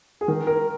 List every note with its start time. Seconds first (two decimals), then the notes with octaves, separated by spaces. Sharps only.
0.21 G#4
0.28 D#3 A#4
0.47 A#4